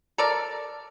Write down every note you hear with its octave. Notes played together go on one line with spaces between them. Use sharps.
A4 A#4 D5